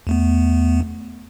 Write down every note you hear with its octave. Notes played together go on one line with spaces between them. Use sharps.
E2 A3 B3